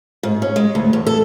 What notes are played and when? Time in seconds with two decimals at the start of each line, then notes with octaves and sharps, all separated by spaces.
0.23 G#2
0.42 C#4
0.56 G#3
0.75 D2
0.93 E2
1.07 A4